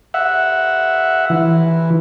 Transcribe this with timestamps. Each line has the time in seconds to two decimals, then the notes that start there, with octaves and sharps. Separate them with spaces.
0.14 E5 F#5
1.30 E3